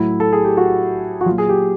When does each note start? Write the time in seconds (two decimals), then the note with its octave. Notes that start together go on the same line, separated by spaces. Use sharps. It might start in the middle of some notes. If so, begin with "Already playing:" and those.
Already playing: A2 F#3 E4
0.20 A4
0.33 G#4
0.44 G4
0.57 F#4
1.21 F#4
1.26 F#3 F4
1.29 A#2
1.38 G#4
1.49 G4